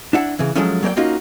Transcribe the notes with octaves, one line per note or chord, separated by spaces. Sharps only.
D4 E4 F#5
C#3 E3
F3 F#3 G#3 A3 C#4
F#3 A#3 D5 G5
A#3 C#4 D#4 F4 F#4